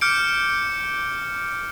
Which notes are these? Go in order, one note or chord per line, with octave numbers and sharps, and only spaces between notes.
D6 F6 G6 C#7 D7